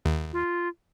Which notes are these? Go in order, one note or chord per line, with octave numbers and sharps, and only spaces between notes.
D#2
F4